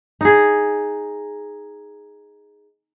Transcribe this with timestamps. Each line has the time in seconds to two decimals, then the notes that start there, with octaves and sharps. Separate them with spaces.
0.21 D#4 G#4